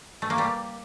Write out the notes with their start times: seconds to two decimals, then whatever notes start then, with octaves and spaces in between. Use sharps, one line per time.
0.22 A3
0.30 A#3
0.38 G3